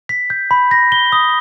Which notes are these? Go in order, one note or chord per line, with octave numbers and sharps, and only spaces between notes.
B6
G6
B5
A#6
G7
D#6